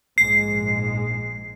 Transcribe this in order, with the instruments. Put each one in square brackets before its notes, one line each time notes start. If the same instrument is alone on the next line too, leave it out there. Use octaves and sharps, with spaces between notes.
[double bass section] A#1 G#2 G#3 [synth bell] C7